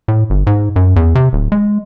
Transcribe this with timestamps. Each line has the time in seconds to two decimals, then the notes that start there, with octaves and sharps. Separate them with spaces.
0.08 A2
0.30 G1
0.47 G#2
0.76 F#2
0.96 E2
1.15 C3
1.33 D1
1.52 G#3